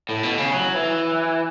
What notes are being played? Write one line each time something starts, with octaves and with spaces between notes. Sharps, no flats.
A2
B2
C#3
F#3
E3